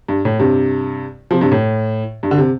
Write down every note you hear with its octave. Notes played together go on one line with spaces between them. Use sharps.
G2
A2
G2 C3
C3 F3
G2 C3
A2
G2
D3
C3